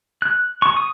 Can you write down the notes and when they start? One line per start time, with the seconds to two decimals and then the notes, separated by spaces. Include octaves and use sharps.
0.22 F#6
0.62 C#6
0.77 D#6